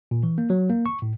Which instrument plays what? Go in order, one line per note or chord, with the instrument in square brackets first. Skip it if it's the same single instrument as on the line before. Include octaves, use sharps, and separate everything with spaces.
[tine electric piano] A#2
E3
A#3
F#3
A#3
C#6
A2